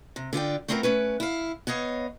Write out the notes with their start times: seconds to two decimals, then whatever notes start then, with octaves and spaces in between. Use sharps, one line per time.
0.16 C3
0.33 D3 F4 D5 G5
0.68 A3 B3 C4 F4 G#4 A#4
0.83 A3 C#4 B4
1.20 E4 F5
1.67 B3 C#5 D#5 F5